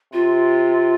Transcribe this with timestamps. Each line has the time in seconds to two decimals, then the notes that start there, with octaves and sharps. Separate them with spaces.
0.13 C3 F4